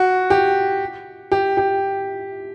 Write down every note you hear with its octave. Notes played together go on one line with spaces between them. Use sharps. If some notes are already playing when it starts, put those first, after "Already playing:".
Already playing: F#4
G4
G4
G4